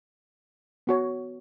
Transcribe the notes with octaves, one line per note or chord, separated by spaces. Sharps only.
B3 F#4 C#5